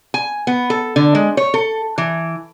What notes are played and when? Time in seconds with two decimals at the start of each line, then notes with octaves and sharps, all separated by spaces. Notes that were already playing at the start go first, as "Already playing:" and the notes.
0.14 G#5
0.47 B3
0.70 A4
0.96 D3
1.15 G#3
1.37 C#5
1.54 A4
1.98 E3